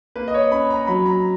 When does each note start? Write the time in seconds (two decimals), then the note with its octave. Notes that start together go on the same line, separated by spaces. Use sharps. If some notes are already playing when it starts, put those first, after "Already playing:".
0.16 A#3 B4
0.28 D#5
0.34 C#5
0.51 C#4 B5
0.70 A#5
0.87 F#3 B5
1.06 A#5